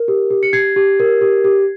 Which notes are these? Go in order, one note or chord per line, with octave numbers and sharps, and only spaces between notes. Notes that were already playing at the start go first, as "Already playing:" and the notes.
Already playing: A#4
G4
G4
C#7
G4 G#6 C7
G4
A#4
G4
G4